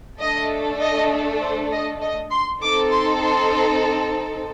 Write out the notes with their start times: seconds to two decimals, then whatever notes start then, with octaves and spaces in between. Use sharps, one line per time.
0.19 A3 D4 A4 D#5
0.80 D#5
1.41 C5
1.71 D#5
2.01 D#5
2.31 C6
2.61 C4 D#4 A4 D6
2.92 C6
3.22 C6